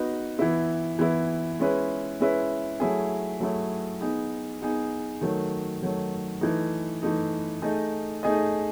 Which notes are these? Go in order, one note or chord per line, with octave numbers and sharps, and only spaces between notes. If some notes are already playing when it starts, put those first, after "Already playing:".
Already playing: B3 D#4 F#4 B4 D#5
E3 B3 E4
E3 B3 E4
G#3 C#4 E4 B4
G#3 C#4 E4 B4
F#3 A3 E4 G#4
F#3 A3 E4 G#4
B3 D#4 G#4
B3 D#4 G#4
D#3 F#3 A3
D#3 F#3 A3
E3 A3 D#4
E3 A3 D#4
A3 D#4 G#4 D#5
A3 D#4 G#4 D#5